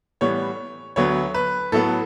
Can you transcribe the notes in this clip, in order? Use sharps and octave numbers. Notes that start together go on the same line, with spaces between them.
A2 E3 G3 B3 C#5
D2 D3 F#3 B3 C#5
B4
A2 F#3 B3 A4